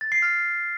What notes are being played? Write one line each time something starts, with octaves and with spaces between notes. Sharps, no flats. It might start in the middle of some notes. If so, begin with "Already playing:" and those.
A6
C7
F6